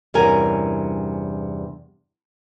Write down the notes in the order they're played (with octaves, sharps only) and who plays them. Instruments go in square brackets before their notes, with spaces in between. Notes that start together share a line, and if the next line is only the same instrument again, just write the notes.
[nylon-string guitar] E2 G2 C3 C#4 A#4 G#5